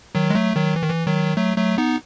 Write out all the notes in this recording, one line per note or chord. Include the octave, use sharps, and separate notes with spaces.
D#3 F#3
G#3
F#3 A3
D#3 F#3
E3
D#3
E3
D#3 F#3
F#3 A3
F#3 A3
B3 D#4